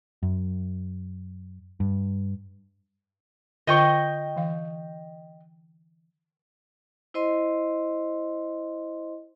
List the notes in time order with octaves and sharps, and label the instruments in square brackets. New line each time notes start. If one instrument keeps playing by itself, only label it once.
[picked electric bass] F#2
G2
[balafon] D3 F4 C5 [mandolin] D#5 G5 C#6
[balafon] E3 F5
[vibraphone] E4 C5 D#5 C6